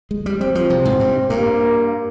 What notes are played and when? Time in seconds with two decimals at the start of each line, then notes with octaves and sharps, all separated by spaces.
0.11 G#3
0.26 G3
0.41 G3 C4
0.55 F3
0.70 C3
0.85 G#2
1.00 G2
1.30 G2 A#3